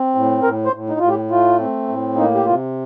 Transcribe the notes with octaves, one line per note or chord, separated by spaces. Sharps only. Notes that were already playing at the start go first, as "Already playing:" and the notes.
Already playing: C4
A2
A2 A#4
C5
A2
D#4
A2 F4
G4
A3 F4
C4
A2
A#3 D#4
G4
C3 F4